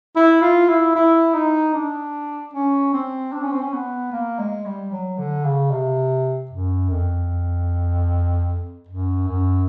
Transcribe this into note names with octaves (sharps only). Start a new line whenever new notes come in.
E4
F4
E4
E4
D#4
D4
C#4
C4
D4
C#4
C4
C#4
B3
A#3
G#3
G3
F#3
D3
C#3
C3
F#2
F2
F#2
F#2